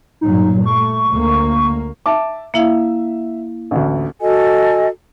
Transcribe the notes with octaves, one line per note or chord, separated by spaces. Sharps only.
G2 A#2 F#3 D#4
A3 C#6
D2 A#3
E5 A5 D6
A#3 E4 E5 F5
A1 D2
F#4 A4 D#5 G#5